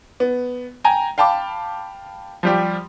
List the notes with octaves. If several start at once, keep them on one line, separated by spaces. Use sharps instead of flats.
B3
G5 G#5 A#5
F5 G5 A5 B5 D6
F3 G3 G4